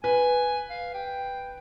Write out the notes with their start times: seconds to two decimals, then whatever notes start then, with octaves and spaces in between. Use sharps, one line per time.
0.04 B4 G#5
0.70 F5
0.94 G5